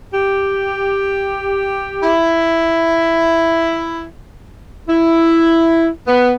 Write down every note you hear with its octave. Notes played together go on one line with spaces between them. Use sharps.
G4
E4
E4
B3